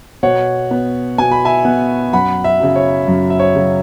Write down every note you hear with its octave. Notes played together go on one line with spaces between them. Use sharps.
B2 C#5 F#5
B3
B2 G#5
B5
E5 G#5
B3
F#2 F#5 B5
E5
C#3 F#3
C#5
F#2
E5
C#5
C#3 F#3